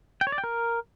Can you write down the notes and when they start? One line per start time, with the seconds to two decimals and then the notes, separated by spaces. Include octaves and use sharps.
0.21 G5
0.27 C#5
0.32 D5
0.38 G5
0.44 A#4